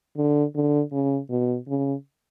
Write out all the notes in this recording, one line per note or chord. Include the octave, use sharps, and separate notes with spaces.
D3
D3
C#3
B2
C#3